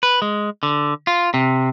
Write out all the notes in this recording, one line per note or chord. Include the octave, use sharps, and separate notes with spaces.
B4
G#3
D3
F4
C3